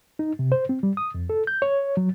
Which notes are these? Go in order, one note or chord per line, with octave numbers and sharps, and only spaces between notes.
D#4
C3
C5
C4
G3
D#6
F2
A4
G6
C#5
F#3